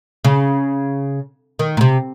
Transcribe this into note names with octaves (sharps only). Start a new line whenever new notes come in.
C#3
D#3
A#2
C3